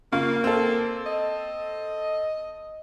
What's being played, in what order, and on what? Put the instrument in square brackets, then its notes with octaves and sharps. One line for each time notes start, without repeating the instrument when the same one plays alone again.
[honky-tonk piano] C#3 F4 [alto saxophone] A#3
[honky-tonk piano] C4 A4
[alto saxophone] D#5